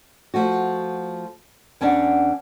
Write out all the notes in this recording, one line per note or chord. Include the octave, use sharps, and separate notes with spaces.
F3 A3 F#4
E2 C#4 D4 D5 F#5